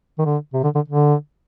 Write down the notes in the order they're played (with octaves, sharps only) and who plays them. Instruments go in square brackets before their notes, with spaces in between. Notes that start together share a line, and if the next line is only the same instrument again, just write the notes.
[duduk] D#3
D3
C3
D3
D3
D3